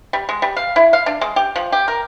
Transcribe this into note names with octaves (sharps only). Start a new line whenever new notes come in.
G3
G#3
G3
F5
E4
F5
D4
G#3
G4
F3
G4
A#4